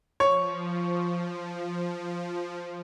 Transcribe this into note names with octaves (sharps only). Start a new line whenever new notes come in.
F3 C#5 C#6